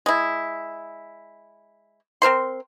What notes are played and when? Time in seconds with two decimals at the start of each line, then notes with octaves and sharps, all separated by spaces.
0.06 G#3 E4
2.22 C4 A#4 C5 C6